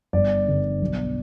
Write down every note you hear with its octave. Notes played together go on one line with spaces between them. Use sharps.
G1 D5
G2 D3
B1